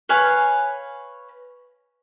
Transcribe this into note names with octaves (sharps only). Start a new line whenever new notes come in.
B4 C#5 F5 G#5